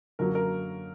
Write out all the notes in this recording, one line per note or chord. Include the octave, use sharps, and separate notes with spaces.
F#2 D3 F#3 A#3 A#4
A#4